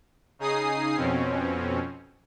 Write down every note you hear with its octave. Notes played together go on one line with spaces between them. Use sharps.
C#3 D#4 G#4 D#6 C7
F2 B2 C4 C#4